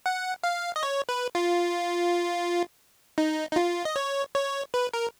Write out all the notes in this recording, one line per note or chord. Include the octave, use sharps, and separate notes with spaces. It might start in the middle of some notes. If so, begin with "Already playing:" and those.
F#5
F5
D#5
C#5
B4
F4
D#4
D#4
F4
D#5
C#5
C#5
B4
A#4